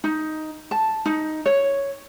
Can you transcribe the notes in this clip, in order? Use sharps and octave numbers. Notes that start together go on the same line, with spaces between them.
D#4
A5
D#4
C#5